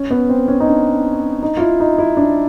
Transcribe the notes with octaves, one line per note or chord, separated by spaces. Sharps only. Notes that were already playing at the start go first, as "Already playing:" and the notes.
Already playing: C#4
B3
C4
C#4
D#4
D4
D#4
F4
E4
D#4
E4
D4